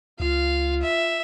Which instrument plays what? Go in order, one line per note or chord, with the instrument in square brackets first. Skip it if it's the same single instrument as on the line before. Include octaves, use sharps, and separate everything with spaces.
[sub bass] C#2 [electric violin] F4 [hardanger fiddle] F5
[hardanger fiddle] E5